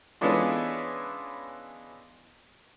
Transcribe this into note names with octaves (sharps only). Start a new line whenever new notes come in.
E3 G#3 B3 C#4 D4 F4